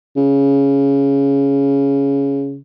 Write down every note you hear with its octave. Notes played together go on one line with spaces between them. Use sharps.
C#3